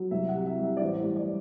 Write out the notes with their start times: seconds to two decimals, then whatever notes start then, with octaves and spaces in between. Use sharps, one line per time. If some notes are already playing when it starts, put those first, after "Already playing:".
Already playing: F#3
0.11 C2 E5
0.29 F#5
0.35 C3
0.46 E5
0.58 G3
0.64 E5
0.77 D5
0.81 A1 C5
1.04 G2
1.16 D5